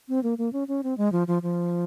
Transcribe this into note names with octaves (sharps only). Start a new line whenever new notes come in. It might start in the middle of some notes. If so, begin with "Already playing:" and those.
C4
A#3
A#3
C#4
C#4
C4
G#3
F3
F3
F3